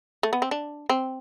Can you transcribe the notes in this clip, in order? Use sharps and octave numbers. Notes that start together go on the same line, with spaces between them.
A3
B3
C4
D4
C4